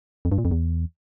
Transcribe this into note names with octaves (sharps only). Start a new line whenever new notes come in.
F2
G2
A#2
F2
E2